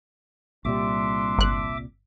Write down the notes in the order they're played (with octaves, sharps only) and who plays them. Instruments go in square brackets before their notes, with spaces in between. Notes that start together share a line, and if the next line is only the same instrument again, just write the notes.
[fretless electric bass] C2 A#2 G3 [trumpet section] D4 C6 [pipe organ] E5 D6
[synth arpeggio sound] G1 F#6